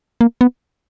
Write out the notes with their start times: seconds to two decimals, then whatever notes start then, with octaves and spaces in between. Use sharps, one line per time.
0.21 A#3
0.41 B3